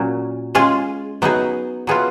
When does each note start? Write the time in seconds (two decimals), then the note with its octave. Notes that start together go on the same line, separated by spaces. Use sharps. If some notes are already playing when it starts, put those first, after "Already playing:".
Already playing: A#2 F#3 C#4
0.55 G#3 C#4 F4 G#4
1.22 F#3 B3 D#4 G#4
1.87 F#3 B3 F4 G#4